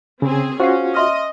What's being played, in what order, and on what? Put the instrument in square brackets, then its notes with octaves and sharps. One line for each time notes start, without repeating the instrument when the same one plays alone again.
[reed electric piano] C#3 [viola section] C4 G#4
[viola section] C#4 [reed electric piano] F4 F#4 [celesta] C5 F5 C7
[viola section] D#5 [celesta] E5 C6 F6